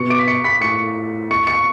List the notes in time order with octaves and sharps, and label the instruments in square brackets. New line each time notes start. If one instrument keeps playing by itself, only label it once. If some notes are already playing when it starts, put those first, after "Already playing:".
Already playing: [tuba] B2 [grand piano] C#6 C#7
[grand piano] D6 D7
B6
C#6 C#7
B5 B6
[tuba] A2 [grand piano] C#6 C#7
[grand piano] C#6 C#7
C#6 C#7